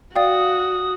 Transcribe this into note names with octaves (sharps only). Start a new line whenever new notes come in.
F#4 D5 F5 G5 D#6